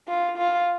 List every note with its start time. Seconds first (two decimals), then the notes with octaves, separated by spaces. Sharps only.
0.08 F4
0.38 F4